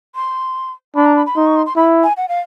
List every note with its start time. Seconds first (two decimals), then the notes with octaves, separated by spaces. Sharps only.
0.15 C6
0.95 D4 B5
1.06 A#5
1.16 B5
1.26 B5
1.36 D#4 C6
1.46 C#6
1.56 C6
1.66 C6
1.76 E4 B5
2.03 G#5
2.17 F#5
2.29 F5